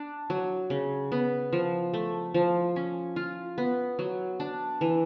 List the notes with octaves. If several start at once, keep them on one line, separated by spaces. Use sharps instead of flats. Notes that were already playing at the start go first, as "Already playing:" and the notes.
Already playing: D4
F#3
C#3
B3
F3
A3
F3
C#4
F4
B3
F#3
D4
E3